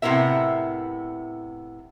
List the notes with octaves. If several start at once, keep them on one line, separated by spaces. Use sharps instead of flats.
A2 C3 B3 E4 A#4 E5